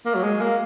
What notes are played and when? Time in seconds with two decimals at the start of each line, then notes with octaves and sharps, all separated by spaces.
0.06 A#3
0.15 F#3
0.23 G#3
0.41 A#3